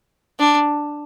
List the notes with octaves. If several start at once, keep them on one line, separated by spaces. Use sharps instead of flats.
D4